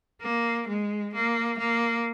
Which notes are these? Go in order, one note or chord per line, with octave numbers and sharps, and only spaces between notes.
A#3
G#3
A#3
A#3